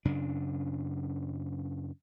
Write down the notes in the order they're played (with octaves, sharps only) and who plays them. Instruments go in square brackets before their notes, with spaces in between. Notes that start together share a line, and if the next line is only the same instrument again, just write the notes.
[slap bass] F#2 C#3 D4